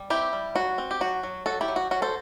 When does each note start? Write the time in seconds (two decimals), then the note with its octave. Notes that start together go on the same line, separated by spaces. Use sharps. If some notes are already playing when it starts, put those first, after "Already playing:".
Already playing: G3
0.10 C4 E4 G4
0.33 G3
0.56 F#3 F#4
0.78 C4
0.91 G4
1.01 F#3 F#4
1.23 F#3
1.46 F#3 F#4 A4
1.61 E4 G4
1.68 F#3
1.76 F#4
1.91 F#3 F#4
2.02 A4 C5